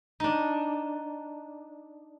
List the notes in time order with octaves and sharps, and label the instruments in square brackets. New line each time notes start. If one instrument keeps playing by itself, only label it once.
[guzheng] D4 D#4